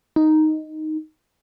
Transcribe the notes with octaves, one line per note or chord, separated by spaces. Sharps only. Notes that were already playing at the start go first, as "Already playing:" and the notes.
D#4